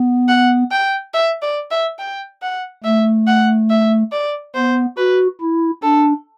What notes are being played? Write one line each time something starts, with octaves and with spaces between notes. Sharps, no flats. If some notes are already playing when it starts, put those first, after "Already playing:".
Already playing: B3
F#5
G5
E5
D5
E5
G5
F#5
A3 E5
F#5
E5
D5
B3 C5
F#4 B4
E4
D4 A4